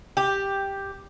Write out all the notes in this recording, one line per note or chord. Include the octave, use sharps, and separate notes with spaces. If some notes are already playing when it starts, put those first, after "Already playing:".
G4